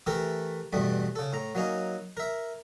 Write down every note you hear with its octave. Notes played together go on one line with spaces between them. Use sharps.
E3 A3 G4 A4 A#4
E2 G2 B2 G3 A3
C#3 A4
A2 A#5
F#3 A#3 C#4 D#4
A#4 E5